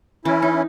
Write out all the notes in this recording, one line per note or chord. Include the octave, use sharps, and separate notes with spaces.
E3 C#4 E4
D#4